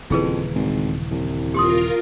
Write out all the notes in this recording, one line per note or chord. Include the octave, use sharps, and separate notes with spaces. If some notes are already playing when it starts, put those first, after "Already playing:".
D#1 F2 C#3 E3 E4 G#4 B4
G#1
C2
F4 G4 A#4 C6 D#6